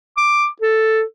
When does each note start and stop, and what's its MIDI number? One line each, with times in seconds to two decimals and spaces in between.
0.17 0.47 86
0.62 1.02 69